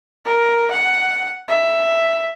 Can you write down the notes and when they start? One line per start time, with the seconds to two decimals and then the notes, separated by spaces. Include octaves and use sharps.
0.25 A#4
0.71 F#5
1.48 E5